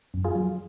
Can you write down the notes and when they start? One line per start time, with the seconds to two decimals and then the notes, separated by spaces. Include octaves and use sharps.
0.14 F#2
0.25 F4 G#4
0.35 F#3